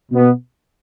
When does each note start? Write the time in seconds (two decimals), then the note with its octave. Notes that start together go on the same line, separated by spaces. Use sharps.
0.11 B2 B3